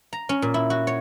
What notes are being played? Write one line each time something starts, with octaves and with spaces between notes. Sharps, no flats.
A#5
C#4
A#2
E4
F#4
C#5